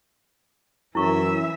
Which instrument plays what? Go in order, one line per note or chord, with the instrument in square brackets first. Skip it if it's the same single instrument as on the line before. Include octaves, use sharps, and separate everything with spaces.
[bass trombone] F#2 [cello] E3 E5 [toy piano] E4 C#6